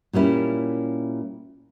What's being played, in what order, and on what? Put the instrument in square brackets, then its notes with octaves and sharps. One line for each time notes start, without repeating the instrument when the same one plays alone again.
[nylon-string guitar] A#2 G3 C#4 E4